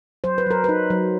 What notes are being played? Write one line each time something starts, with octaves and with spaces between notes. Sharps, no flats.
F#3 C5
B4
F#3 A#4
D#4 B4
F#3